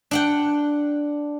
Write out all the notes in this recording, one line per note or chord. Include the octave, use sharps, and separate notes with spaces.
D4 F#5 G5